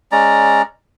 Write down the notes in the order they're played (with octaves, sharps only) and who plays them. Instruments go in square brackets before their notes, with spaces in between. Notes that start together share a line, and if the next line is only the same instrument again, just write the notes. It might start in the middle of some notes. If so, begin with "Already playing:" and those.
[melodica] G#3 C#4 D5 A#5